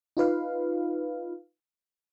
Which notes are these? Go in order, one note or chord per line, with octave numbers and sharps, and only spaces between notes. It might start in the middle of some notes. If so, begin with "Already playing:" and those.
D#4 F4 B4 F5